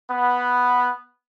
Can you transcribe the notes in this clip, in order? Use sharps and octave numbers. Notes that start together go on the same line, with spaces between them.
B3